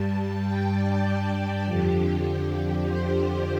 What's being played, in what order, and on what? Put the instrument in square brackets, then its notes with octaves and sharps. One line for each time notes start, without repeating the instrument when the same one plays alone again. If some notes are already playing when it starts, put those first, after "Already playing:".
Already playing: [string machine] G2 G3 A5
G5
D5
F2 D3 F3 G4
G4
C5